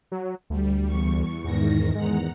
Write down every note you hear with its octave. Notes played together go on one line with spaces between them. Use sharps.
F#3
D2 G3
E2 C#6
E2 G#2 D#3 A#6
E2 G#3 F#5 A#5